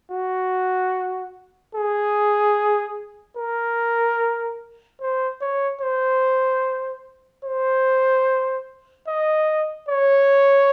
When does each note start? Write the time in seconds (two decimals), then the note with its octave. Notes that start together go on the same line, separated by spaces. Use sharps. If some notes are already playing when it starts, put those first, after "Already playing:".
0.11 F#4
1.75 G#4
3.37 A#4
5.01 C5
5.41 C#5
5.81 C5
7.45 C5
9.08 D#5
9.89 C#5